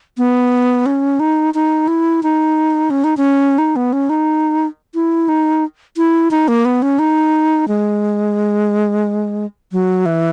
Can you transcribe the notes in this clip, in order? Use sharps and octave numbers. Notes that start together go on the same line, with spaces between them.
B3
C#4
D#4
D#4
E4
D#4
C#4
D#4
C#4
D#4
B3
C#4
D#4
E4
D#4
E4
D#4
A#3
B3
C#4
D#4
G#3
F#3
E3